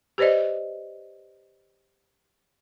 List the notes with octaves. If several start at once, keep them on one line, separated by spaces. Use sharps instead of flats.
G4 B4 C5 D5 D#5